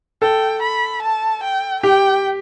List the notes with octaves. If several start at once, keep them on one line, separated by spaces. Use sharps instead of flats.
A4 G5
B5
A5
G5
G4 G5